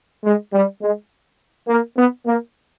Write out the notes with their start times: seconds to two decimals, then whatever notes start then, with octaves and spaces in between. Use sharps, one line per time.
0.24 G#3
0.53 G3
0.82 G#3
1.68 A#3
1.97 B3
2.25 A#3